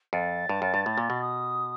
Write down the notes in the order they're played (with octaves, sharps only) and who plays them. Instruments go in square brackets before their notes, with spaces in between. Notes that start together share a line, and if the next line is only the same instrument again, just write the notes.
[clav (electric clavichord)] F2 [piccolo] A6
[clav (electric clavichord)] G2
F#2
G2
A2
A#2
B2
[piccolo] D#6